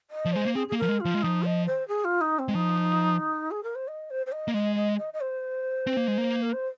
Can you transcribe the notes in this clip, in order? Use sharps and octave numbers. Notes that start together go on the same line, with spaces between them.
D#5
F3
G#3 C5
A#3
C4 G#4
G#4
A#3
F3 A#4
G#3
F4
F3
G#3
F3 D#4
D#5
C5
G#4
F4
D#4
C4
G#3
F3 D#4
G#4
A#4
C5
D#5
C5
C5
D#5
A#3
G#3 D#5
D#5
D#5
D#5
C5
C4
A#3
G#3
A#3
A#4
C5